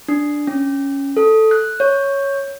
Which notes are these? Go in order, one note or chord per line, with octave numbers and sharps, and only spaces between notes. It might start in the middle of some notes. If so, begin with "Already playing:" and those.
D4
C#4
A4
F#6
C#5